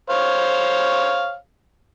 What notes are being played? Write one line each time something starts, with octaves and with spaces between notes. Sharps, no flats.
C5 C#5 F5